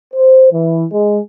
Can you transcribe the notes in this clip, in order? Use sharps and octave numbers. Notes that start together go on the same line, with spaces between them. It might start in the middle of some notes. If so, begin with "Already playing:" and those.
C5
E3
G#3